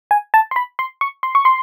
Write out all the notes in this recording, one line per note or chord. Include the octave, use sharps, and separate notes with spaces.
G#5
A5
C6
B5
C6
C#6
C6
C#6
C6